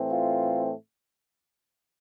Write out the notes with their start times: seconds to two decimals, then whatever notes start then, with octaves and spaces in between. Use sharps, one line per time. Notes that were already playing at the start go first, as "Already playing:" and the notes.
Already playing: A2 E3 A3 C4
0.11 F4